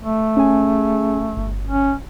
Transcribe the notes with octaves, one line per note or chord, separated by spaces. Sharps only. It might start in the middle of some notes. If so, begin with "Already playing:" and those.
A3
C#4 G#4 G#5
G1
C#4